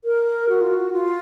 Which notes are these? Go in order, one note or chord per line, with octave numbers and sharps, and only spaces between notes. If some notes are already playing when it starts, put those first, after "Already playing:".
A#4
F#4
F4
F#4
F4